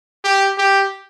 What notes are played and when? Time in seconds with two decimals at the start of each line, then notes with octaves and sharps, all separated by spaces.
0.24 G4
0.58 G4